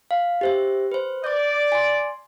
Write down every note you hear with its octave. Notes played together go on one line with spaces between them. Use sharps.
F5
G4 C5 E5
B4 C5
D5 D6 G6
G#5 C6